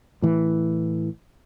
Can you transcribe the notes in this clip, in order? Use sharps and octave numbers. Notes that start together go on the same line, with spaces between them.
A2 E3